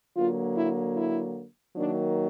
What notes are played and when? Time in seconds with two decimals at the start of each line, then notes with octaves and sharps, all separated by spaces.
0.16 D3 F#3 A#3 F4
0.57 E4
0.97 E4
1.77 D#3 F#3 A#3 D4